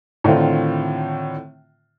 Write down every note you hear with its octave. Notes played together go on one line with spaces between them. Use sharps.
A2 D3 D#3 C4 F4